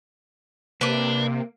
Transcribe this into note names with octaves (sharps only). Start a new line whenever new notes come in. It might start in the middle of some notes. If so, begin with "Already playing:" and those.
C3 A#3 D4 B4 D6